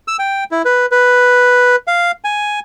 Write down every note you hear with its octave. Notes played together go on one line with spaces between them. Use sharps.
E6
G5
E4
B4
B4
F5
G#5